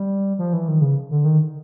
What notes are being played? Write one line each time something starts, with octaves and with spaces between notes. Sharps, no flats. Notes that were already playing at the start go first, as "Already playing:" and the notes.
Already playing: G3
F3
E3
D#3
C#3
D3
D#3